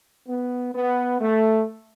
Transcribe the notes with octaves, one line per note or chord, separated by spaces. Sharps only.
B3
B3
A3